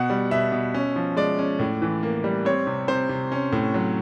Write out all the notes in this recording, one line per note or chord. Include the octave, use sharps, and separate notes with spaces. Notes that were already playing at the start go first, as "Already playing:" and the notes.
Already playing: B2 F#5
G3
B2 E5
B2
C#4
F3
G#3 D5
C#4
A2
E3
A#3
G3
C4 C#5
C3
C3 C5
C3
C#4
A2
F#3